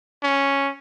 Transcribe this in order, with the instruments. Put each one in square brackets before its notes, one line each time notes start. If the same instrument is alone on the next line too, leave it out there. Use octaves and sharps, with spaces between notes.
[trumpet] C#4